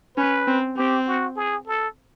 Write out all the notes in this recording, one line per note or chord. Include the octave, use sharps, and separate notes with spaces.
C#4 B4
C4
C4 G4
F#4
G#4
A4